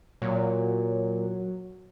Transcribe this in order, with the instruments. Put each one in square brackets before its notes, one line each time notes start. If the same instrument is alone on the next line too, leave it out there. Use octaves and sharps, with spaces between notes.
[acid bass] A#2 [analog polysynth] F#3